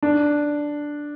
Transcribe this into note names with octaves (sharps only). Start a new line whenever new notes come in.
D4